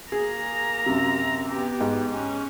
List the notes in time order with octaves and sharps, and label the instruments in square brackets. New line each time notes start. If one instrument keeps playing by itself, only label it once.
[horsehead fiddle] A#3 A#5 [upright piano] G#4
[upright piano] F#2 C3
[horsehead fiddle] B3 G4
[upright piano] G#2
[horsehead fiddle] C#4